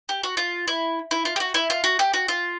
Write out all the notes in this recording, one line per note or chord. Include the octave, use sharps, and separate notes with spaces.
G4
F#4
F4
E4
E4
F4
G4
F#4
E4
F4
F#4
G4
F#4
F4